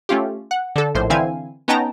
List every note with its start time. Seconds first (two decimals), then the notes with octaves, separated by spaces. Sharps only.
0.09 A3 C#4 F4 G4
0.51 F#5
0.76 D3 A4
0.95 A#1 A2 C5
1.10 D3 E3 C4 E4 F5 G#5
1.68 B3 C#4 D#4 G5 A5 A#5